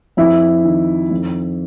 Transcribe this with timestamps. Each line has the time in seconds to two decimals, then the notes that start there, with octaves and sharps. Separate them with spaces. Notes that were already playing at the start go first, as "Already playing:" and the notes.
0.17 F2 E4
0.64 D#3
1.11 F2